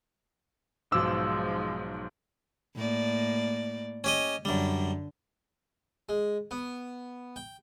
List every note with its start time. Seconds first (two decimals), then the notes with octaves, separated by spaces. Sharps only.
0.92 B1 G#2 F3 G#3 D6 E6
2.76 A2 A#3 D5
4.04 C#4 G4 D#5
4.45 F#2 D3 G3
6.09 G#3
6.51 B3
7.36 G5